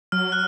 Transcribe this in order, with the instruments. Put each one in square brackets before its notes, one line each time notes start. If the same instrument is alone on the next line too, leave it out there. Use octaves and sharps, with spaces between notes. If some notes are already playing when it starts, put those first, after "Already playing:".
[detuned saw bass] F#3 [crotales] F6
[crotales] F#6